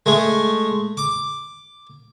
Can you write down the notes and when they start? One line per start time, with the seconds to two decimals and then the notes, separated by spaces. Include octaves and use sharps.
0.06 G#3 A3
0.97 D6